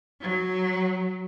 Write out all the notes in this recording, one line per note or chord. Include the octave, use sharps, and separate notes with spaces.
F#3